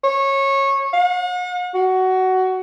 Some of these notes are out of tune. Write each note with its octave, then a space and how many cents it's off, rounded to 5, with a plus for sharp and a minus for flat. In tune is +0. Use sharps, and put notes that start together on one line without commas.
C#5 -20
F#5 -40
F#4 +15